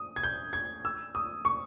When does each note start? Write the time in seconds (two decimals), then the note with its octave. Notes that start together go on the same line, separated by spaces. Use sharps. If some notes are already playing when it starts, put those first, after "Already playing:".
Already playing: D#6
0.16 G#6
0.23 G6
0.53 G#6
0.85 E6
1.15 D#6
1.45 C#6